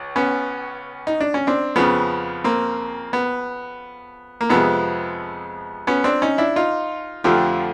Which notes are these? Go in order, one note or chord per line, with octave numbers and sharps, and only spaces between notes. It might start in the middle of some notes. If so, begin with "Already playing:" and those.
Already playing: C#2
B3 C#4
D#4
D4
C#4
C4 D4
F2 C#3 F3 B3
A#3 C4
B3
A#3
F2 C3 F3 G#3 B3
B3 C#4
C4 D4
C#4 D#4
D4 E4
D#4 F4
F2 D3 F3 A3 F4 G4